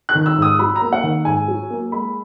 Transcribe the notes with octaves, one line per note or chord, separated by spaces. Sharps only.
F#6
D#3
E6
G#2
D#6
F#3 B5
A#5
A#3
F#5
D#3
G#2 G#5
F#3
A#3
G#3 B5